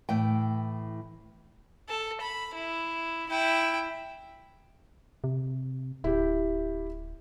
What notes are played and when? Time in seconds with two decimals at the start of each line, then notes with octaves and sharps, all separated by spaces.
0.09 A2 E3 G5
1.89 A4
2.21 B5
2.54 E4
3.29 E4 G5
5.24 C3
6.04 D1 E4 G4